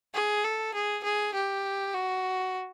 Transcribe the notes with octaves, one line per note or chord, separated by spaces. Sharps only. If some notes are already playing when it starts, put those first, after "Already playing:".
G#4
A4
G#4
G#4
G4
F#4